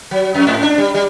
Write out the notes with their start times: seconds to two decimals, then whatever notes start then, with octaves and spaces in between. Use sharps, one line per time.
0.11 F#3
0.34 F2
0.47 G#2
0.63 D4
0.78 G3
0.94 G3